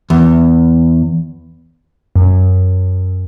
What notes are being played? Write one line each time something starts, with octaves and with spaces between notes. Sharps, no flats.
E2
F#2